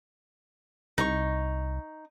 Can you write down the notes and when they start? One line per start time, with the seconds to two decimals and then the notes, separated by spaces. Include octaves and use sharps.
0.98 C2 D#4 C#6